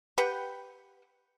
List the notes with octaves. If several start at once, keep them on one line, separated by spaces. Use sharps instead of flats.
G4 B4 F#5 G5